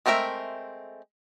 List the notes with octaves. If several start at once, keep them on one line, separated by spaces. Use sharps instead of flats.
G#3 A3 C4 A#4 E5